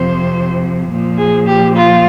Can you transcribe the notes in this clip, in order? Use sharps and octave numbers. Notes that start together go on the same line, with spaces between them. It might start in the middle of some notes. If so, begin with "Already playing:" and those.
Already playing: F2 C3 F3 C5
A#2 F3
G#4
G4
F4